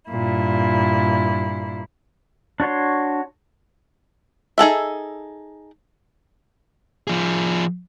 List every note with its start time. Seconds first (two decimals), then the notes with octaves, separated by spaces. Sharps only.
0.10 G2 A#2 E4
2.60 D4 F#4 C#5 C6
4.58 D#4 G#4 A4 E5
7.08 F3 G#4